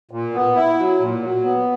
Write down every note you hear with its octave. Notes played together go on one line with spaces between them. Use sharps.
A#2
B3
E4
F#3
A#2
F#3
B3